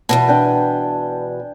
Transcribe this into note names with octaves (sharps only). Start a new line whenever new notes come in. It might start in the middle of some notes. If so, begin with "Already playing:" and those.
E2 G#2 B2 A5
D4 G5 G#5